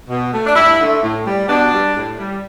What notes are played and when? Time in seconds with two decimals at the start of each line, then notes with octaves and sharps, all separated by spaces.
0.09 B2
0.33 A3
0.46 D4
0.56 G2 E4
0.79 D3 A3
1.03 A2
1.26 G3
1.49 B2 D4
1.73 G3
1.95 A2
2.19 G3